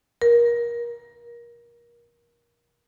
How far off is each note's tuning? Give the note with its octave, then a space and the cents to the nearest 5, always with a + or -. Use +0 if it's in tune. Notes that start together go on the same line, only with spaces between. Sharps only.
A#4 +25